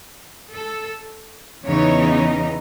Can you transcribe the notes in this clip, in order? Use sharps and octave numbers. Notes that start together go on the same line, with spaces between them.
A4
E2 C#3 E3 B3 D#4 C#5